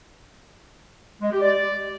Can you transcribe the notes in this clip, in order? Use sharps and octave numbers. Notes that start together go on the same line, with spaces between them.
G#3
G4
D5